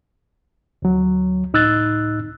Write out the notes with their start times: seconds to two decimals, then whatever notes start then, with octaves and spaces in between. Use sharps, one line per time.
0.82 D2 F#3
1.53 C#2 A2 D#4 E6 F#6 A6